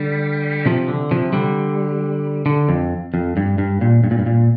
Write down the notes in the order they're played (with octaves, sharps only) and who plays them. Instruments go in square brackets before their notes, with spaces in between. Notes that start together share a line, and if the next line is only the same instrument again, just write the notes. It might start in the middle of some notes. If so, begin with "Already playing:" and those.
Already playing: [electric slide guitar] D3 G3
C3 F3
D3
C3 F3
D3 G3
D3
F2
F2
G2
G2
A#2
G2
A#2
G2
A#2